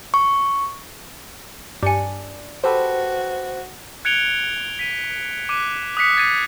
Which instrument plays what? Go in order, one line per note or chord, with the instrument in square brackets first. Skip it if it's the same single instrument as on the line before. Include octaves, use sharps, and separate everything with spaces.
[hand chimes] C#6
[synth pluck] G2 C#7 [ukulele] D4 G#5
[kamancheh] F#4 [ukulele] G4 A4 B4 [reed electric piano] C5
[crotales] F#6 G#6 C#7 D7 F7 G7
B6 D#7
D6 F#6 D#7
D#6 F#6 B6 C#7
G#6 A6 C7 C#7 D#7